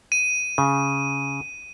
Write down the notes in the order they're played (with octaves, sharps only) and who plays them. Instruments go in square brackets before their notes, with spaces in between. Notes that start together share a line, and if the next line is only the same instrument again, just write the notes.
[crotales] D#7
[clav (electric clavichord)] C#3